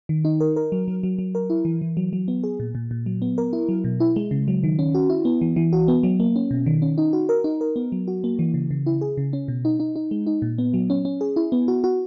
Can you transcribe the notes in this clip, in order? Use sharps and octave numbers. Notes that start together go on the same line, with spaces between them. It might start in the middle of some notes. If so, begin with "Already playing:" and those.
D#3
D#4
A#4
A#4
F#3
F#3
F#3
F#3
A#4
E4
E3
E3
F#3
F#3
B3
G#4
A#2
A#2
A#2
F#3
B3
A#4
E4
F#3
B2
E4
G#3
C#3
F#3
D#3
C#4
F#4
E4
B3
E3
E3
F#4
B3
F#3
A#3
C#4
B2
D#3
C#4
D#4
F#4
A#4
D#4
A#4
B3
F#3
F#4
A#3
E3
C#3
C#3
E4
G#4
C#3
C#4
B2
D#4
D#4
D#4
G#3
D#4
A#2
B3
F#3
C#4
C#4
G#4
E4
B3
F#4
F#4